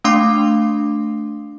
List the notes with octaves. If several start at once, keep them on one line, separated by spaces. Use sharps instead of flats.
A3 D4 F5 C6 D6 C7